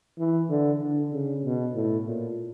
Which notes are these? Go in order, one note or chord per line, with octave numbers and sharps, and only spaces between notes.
E3
D3
D3
C#3
B2
A2
A#2